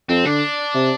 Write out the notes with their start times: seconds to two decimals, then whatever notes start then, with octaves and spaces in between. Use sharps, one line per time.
0.09 F2 C4
0.25 D3 D4
0.74 C3